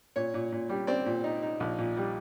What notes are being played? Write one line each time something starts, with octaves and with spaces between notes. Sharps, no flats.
A#2 C#5
A#2
A#2
G3
C4 D5
A#2
D#4
D#4
A#1
A#2
G3